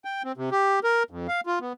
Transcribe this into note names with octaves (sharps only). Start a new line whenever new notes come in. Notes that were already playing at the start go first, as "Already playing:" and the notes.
G5
C4
C3
G4
A#4
F2
F5
F4
B3